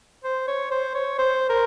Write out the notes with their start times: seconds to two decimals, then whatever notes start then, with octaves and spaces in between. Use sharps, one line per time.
0.24 C5
0.48 C#5
0.71 C5
0.95 C#5
1.19 C5
1.49 A#4